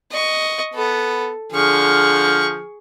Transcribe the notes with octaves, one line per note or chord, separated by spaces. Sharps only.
D#5 C#6
B3 A4
D3 F3 G#4 C#6 F6